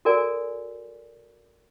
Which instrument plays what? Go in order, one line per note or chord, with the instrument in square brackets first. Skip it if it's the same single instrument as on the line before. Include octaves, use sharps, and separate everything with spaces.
[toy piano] F#4 A4 A#4 D5 G#5